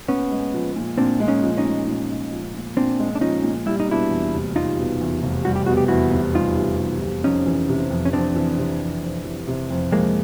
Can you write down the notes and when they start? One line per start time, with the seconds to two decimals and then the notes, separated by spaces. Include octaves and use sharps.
0.08 A#2 B3 C#4
0.31 G#3
0.54 F3
0.76 A#2
0.97 A#2 C4 D4
1.20 G#3
1.28 C#4 D#4
1.43 F3
1.57 C#4 D#4
1.65 A#2
1.88 A#2
2.10 G#3
2.32 F3
2.54 A#2
2.77 A#2 C4 D4
2.99 G#3
3.15 D4
3.21 F3 C#4 D#4
3.44 A#2
3.66 G3 E4
3.80 D#4
3.88 B2 D4 E4
4.11 E2
4.33 F1
4.56 G3 D#4 F4
4.78 B2
5.01 E2
5.23 F1
5.45 G3 F#4
5.56 G4
5.66 B2 F#4
5.77 G4
5.88 E2 E4 F#4
6.12 F1
6.34 G3 D#4 F4
6.57 B2
6.80 E2
7.02 F1
7.24 F2 C#4 D#4
7.46 E3
7.69 C3
7.91 F2
8.05 C#4
8.13 F2 C4 D4
8.35 E3
8.58 C3
8.81 F2
9.03 F2
9.25 E3
9.47 C3
9.70 F2
9.92 F2 G#3 A#3